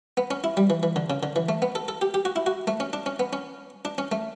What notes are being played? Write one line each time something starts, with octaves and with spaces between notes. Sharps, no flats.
B3
C#4
E4
G3
E3
E3
D3
C#3
D3
E3
A3
B3
A4
A4
G4
G4
F#4
E4
F#4
A3
C#4
D4
C#4
B3
C#4
D4
C#4
A3